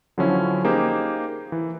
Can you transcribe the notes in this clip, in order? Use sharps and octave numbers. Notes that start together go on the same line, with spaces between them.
D3 F3 F#3 C4 C#4 E4
A#3 D#4 G4 G#4 C5
E3